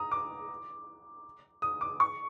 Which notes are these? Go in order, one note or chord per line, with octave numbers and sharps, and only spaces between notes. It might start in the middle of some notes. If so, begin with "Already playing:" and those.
Already playing: A#5 D#6
D6
D#6
D6
C#6